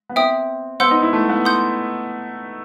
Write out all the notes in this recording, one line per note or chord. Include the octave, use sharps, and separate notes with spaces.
B3
C4 E5 G5 D#6
B3 C5 F#5 C6 E6 G6
D#4
E4
A3
B3
F#5 C6 D#6 G6